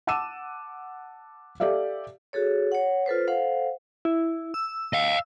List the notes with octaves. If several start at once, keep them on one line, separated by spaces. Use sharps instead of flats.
F#5 A5 D6 E6 D#7 E7
G4 A4 D5 E5 F5
F#4 G#4 A4 C#5
C#5 F#5
F4 A4 B4 C5
A4 C5 F5 F#5
E4
E6
D#5 F5